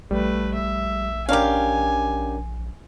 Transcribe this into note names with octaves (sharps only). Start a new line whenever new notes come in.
A#1 G3 A3 B4
E5
C#4 D4 G4 A#4 F5 G#5